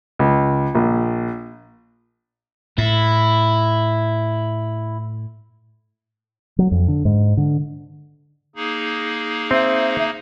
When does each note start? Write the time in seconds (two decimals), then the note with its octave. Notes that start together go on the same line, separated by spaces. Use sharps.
0.19 C#2
0.75 A#1
2.78 A2 E4
6.59 F#3
6.71 F2
6.88 D3
7.05 G#2
7.37 D3
8.56 A#3 D#4 G#4
9.51 C4 E5